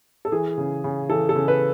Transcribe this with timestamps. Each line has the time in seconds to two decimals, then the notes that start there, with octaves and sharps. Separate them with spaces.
0.25 A4
0.32 E3 G#4
0.58 C#3
0.84 C#3
1.09 E3 A4
1.29 A4
1.36 C#3
1.48 B4